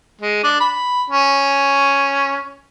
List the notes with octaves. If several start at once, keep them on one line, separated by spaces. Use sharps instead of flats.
G#3
D4
B5
C#4